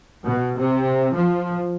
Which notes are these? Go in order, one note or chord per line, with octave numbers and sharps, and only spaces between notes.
B2
C3
F3